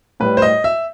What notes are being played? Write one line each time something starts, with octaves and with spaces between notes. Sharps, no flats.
A2 G3 B4
C5
D#5
E5